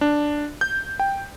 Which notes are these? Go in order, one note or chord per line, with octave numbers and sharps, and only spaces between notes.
D4
G6
G5